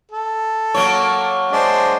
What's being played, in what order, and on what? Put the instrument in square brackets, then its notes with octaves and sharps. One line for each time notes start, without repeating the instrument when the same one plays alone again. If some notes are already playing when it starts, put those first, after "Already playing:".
[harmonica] A4
[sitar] F#3 A#3 C#5
[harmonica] G#3 D4 C5